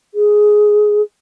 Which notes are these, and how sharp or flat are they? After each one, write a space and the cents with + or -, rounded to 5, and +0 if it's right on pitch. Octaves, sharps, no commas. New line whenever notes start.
G#4 +10